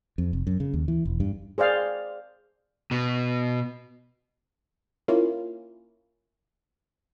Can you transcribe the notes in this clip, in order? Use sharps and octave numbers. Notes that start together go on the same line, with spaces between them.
F2
F1
F#2
C#3
D#2
E3
E1
G2
G#4 C5 D5 F5
B2
A#3 C#4 E4 F4